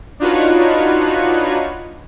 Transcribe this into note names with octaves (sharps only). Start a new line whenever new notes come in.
D4 D#4 F4 F#4 B4 C#5